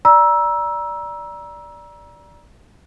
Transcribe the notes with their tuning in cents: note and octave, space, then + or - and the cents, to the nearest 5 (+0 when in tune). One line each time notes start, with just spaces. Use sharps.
D5 +0 A#5 +30 E6 +0